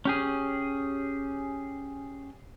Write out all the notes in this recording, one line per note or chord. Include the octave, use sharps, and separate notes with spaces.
C#4 G4 G#4